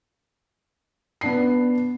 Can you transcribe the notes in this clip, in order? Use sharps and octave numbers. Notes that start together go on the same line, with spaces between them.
B3 D4 C7